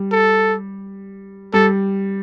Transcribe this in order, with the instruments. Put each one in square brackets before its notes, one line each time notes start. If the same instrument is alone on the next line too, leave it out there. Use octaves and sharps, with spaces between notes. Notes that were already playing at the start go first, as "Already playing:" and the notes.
Already playing: [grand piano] G3
[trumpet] A4
[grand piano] G3 [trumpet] A4